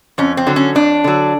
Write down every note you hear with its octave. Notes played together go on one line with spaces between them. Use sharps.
F2 C#4
C4
D3 F#3
C#4
F2 D4
D3 F#3